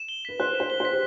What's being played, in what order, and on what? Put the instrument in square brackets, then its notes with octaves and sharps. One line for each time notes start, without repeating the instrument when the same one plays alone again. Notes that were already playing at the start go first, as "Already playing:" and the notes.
Already playing: [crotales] E7
G7
[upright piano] B4 [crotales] B6
[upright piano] C5 [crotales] F#6
[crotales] E7
[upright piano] C5
[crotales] G7
[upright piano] C5 [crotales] B6
[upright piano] G4